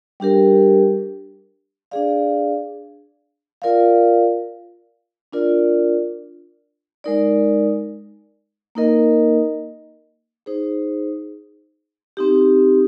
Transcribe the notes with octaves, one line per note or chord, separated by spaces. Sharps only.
G3 D4 G4 A#4
D4 G#4 D5 F5
F4 A#4 D5 F5
D4 F4 A#4 D5
G#3 D#4 A#4 D5
A#3 D#4 A#4 D#5
D#4 G#4 C5
C4 D#4 G4